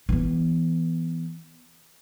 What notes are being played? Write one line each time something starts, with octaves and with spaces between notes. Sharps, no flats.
E3 B3